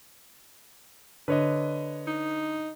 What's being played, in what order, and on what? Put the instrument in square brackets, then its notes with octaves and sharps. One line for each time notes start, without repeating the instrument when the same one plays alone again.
[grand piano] D3 [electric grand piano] B4 C#5 D#5
[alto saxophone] D#4